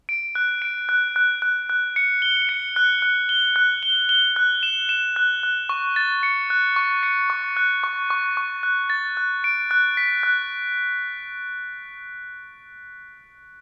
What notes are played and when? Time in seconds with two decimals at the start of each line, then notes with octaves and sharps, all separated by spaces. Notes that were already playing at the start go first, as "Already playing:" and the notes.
0.09 D7
0.35 F#6
0.62 D7
0.89 F#6
1.16 F#6
1.42 F#6
1.70 F#6
1.96 C#7
2.22 G7
2.49 C#7
2.76 F#6
3.02 F#6
3.29 G7
3.56 F#6
3.83 G7
4.09 G7
4.36 F#6
4.63 E7
4.89 E7
5.16 F#6
5.43 F#6
5.69 C#6
5.96 A6
6.23 C#7
6.50 F#6
6.76 C#6
7.03 C#7
7.30 C#6
7.57 F#6
7.84 C#6
8.10 C#6
8.37 C#6
8.63 F#6
8.90 A6
9.17 F#6
9.44 D7
9.71 F#6
9.97 B6
10.23 F#6